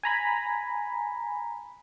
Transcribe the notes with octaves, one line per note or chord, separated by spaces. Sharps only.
G#5 A#5 B5